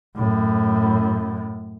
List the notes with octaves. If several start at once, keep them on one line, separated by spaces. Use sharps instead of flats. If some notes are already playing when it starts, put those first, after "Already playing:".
F#2 A2